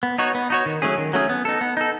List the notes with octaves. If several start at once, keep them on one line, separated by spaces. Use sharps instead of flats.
B3
D#4 F#4 C#5
B3
D#4 F#4 C#5
D#3
F#3 A3 C#4 G#4
D#3
F#3 A3 C#4 G#4
B3
D#4 A4
B3
D#4 A4